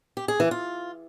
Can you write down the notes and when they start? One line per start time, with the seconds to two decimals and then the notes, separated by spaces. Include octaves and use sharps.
0.17 G4
0.28 G#4
0.40 E3
0.51 F4